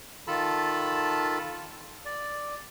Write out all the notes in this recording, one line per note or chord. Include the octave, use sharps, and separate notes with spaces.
D#3 F4 A4 A5 B5
D5